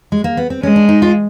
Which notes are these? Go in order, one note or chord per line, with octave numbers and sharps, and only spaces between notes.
G#3
A#3
B3
C4
G#3 C#4
D4
D#4
F4